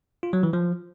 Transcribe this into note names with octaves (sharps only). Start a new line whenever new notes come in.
F4
F#3
E3
F3